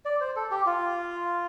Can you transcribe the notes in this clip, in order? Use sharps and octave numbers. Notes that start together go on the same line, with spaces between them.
D5
C5
A4
G4
F4